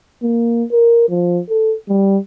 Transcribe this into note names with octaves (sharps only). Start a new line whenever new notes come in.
A#3
A#4
F3
A4
G3